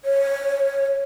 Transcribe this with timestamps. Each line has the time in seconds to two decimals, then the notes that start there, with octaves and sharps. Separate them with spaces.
0.05 C#5